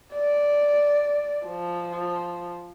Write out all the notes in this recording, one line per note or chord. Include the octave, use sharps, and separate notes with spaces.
D5
F3